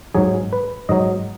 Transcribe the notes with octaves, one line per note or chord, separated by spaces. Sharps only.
G#2 F#3 G#4
B4
G#2 F#3 D#5